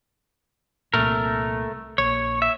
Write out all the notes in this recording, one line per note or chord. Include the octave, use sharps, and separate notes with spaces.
C2 A#2 A3 A#4
A#1 C#5
E5